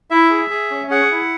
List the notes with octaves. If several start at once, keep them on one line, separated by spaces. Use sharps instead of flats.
E4 E5
G#4
G#4
C#4
G#4 F#5
E4